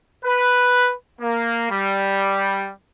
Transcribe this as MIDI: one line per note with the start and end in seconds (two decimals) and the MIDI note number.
0.24 0.91 71
1.21 1.68 58
1.70 2.70 55